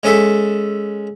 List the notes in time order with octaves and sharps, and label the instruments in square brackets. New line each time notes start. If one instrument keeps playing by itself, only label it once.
[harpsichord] G#3 C#4 A4 E5